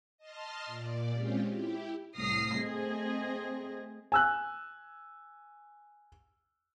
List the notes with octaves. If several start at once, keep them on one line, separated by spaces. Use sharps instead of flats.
D#5 A5 C6 F6
A#2 D5
G#3 C4 C#4 F4 G4
E4 G4
C2 A2 D#6 F6 A#6 C7
A3 C4 G#4 D#5
G#5 E6 F#6